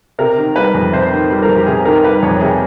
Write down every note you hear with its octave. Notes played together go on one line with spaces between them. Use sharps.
C3 A#4
D#3
G3 B4
F2
C3 C5
D#3
G3
A#4
F2
G4
C3 G#4
D#3 A#4
G3 B4
F2 C#5
C3 G#4